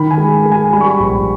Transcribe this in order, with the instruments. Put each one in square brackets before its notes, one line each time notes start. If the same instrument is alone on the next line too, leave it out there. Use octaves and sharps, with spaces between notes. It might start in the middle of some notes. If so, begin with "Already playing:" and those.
Already playing: [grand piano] D#3 B5
G#5
G#3
G#3
G#5
G3 B5
C#6
B5
A#1